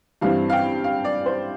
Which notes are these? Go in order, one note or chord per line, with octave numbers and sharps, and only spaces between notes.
G2 E3 G3 C4 F5
F5
G5
F5
D5
C5